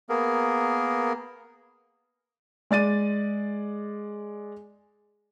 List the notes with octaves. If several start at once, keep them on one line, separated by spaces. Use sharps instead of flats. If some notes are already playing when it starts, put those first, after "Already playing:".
A#3 B3 G#4 A#4
G#3 D5 A6 D#7